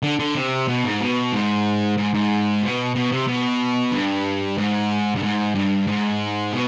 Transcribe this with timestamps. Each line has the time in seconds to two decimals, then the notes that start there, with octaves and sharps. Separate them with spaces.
0.03 D3
0.19 D3
0.35 C3
0.68 B2
0.84 G#2
1.00 B2
1.32 G#2
1.97 G#2
2.14 G#2
2.62 B2
2.95 B2
3.12 C3
3.27 B2
3.92 G2
4.58 G#2
5.15 G2
5.23 G#2
5.55 G2
5.87 G#2
6.52 B2